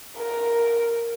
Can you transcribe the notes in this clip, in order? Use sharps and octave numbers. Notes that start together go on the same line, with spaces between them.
A#4